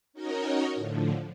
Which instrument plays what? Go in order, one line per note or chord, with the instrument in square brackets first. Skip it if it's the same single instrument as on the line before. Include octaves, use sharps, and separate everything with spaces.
[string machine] C#4 D#4 F#4 A#4 C#5 D#5
A2 D3 F3